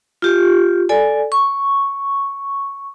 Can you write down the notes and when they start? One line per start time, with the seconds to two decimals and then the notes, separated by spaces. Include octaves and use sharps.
0.22 F4 G4
0.89 A4 D5 G#5
1.32 C#6